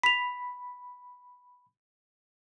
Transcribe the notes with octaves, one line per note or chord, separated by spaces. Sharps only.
B5 B6 F7